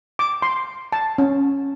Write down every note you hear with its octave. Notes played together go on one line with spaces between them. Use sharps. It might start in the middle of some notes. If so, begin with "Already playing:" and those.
D6
C6
A5
C#4